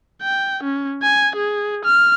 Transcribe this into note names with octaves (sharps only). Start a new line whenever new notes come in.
G5
C#4
G#5
G#4
F6